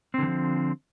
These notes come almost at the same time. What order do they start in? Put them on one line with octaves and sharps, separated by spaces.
C4 D3 E3 F3